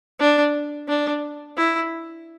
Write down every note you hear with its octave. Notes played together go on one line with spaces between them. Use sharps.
D4
D4
E4